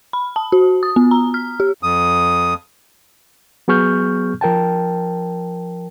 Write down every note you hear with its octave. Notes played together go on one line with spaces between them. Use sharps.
B5
A5
F#4
D#6
B3
A#5
F6
G4
F2 D#6
F#3 B3 G#4 C#6 F6 G6
F3 A#4 G5 A5